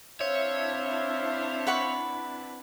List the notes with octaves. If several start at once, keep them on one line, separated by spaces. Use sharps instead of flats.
C4 D4 E4 C5 C#5 E5 F5
B4 F#5 C#6